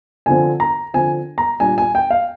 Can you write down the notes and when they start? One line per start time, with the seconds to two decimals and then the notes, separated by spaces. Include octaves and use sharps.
0.26 D3 F3 C4 G#5
0.60 A#5
0.94 D3 F3 C4 G#5
1.38 A#5
1.60 A#2 G3 D4 G#5
1.78 G#5
1.95 G5
2.10 F5